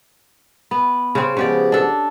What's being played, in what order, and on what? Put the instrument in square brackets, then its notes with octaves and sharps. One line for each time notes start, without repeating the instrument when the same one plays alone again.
[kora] B3
C#3 C4
[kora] C#3 G4 D5 [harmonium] F3 G#3 B3
[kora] D4 A4